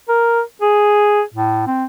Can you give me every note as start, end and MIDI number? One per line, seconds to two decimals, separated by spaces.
0.08 0.41 70
0.62 1.22 68
1.34 1.62 45
1.67 1.85 60